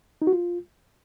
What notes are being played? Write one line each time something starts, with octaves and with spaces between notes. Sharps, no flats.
D#4
F#4
F4